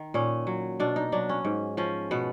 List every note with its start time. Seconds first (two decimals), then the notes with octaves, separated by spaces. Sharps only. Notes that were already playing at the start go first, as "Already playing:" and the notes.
Already playing: D#3
0.14 A#2 C#4
0.47 F#3
0.80 B2 D4
0.96 D#4
1.12 F#3 D4
1.29 C#4
1.45 G#2
1.77 F3 C#4
2.11 B2 B3